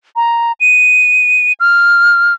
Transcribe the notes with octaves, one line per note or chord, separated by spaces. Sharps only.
A#5
D#7
F6